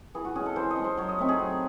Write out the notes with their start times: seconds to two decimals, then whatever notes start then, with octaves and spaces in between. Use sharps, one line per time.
0.15 E3 G#4
0.25 F#4
0.35 G#3 C#4 G#4
0.46 A4
0.56 E3 C5
0.71 D#5
0.77 G#3 C#4
0.84 C5
0.97 F#3 C#5
1.08 D#5
1.19 A3 C4 D#4 E5
1.29 G#4
1.39 F#3